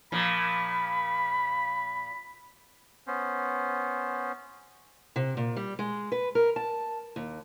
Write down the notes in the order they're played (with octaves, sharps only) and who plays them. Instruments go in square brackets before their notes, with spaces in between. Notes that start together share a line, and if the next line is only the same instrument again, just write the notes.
[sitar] A#2 F3 [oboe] B5
[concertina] B3 C#4 C5
[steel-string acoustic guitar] C3
A#2
G3
G#3
B4
A#4
A5
D#2